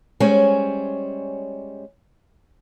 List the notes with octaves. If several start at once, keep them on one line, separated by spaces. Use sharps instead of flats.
G3 G#3 C#4 C5 C#5 G#5